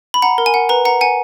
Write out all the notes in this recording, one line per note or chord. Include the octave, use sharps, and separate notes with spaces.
B5
F#5 A#5
A#4
G#5
F#5
B4 A#5
F#5 A#5
F#5 G#5